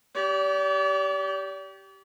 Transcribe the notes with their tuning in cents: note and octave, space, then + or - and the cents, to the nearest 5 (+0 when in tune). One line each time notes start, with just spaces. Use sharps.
G4 -10 D5 -40